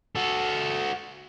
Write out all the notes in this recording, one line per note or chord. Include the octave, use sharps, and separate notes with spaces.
F#4 A4